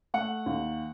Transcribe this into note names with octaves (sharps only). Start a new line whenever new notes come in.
A3 F#5
D#2